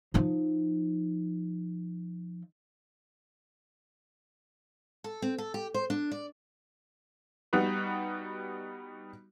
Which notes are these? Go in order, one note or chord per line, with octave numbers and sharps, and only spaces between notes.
F3 D#4
A4
C4
A4
G4
C5
D4
D5
G3 B3 D#4 F#4 B4